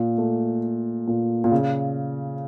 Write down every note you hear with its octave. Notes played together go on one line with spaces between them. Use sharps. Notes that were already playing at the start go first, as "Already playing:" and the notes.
Already playing: A#2
A3
A#2
A#2
C#3